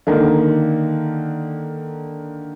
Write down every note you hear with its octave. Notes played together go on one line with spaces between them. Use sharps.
D3 D#3 A#3